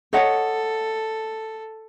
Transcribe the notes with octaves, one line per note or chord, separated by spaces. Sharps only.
A4 C#5 D#5 F#5